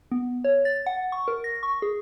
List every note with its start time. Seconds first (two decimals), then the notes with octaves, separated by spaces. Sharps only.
0.12 B3
0.44 C#5
0.65 A6
0.86 F#5
1.12 C#6
1.28 A#4
1.44 A#6
1.63 C#6
1.82 G#4